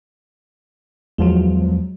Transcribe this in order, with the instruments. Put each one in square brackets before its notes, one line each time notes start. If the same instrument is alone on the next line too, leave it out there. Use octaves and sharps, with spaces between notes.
[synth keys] E2 F3 [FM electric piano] F#3 G#3